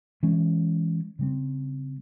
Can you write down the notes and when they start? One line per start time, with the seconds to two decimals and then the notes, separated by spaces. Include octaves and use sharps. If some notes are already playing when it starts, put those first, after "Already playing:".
0.23 E3 G#3 C#4
1.19 C#3 G3 C4